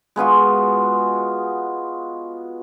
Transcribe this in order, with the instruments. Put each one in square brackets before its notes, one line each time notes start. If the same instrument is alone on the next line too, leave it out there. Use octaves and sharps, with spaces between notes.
[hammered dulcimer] G#3 B3 F4 F#4